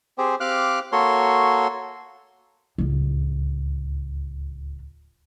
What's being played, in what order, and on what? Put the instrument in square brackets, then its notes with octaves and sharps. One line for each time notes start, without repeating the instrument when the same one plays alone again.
[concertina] C4 G4 G#4 C5
C4 G4 F5 D6 F6 F#6
A#3 F#4 A4 C#5 C6
[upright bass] D1 C#2